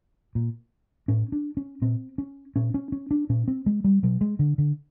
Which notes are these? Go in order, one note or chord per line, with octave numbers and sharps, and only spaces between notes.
A#2
A2 C#4
D4
C#4
A#2 C4
C#4
A#2 C#4
C#4
C#4
D4
A#2 C#4
C4
G#3
G3
B2 F#3
G#3
D3
D3